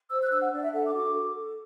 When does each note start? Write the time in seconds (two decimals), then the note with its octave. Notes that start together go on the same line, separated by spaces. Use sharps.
0.10 C5 E6
0.21 F#6
0.31 D4 E6
0.41 F#5
0.53 D4 D5
0.63 E5
0.73 A4 F#5
0.84 D6
0.94 F#4 D6
1.15 A4
1.36 A4